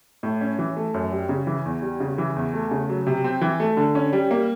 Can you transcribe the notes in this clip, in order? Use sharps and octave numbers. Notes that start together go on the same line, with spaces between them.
A2
C#4
E3
A3
F#2
G3
C#3
E3
E2
G3
C#3
E3
E2
A3
C#3
F#3
C3
C4
E3
A3
D3
C#4
G3
A#3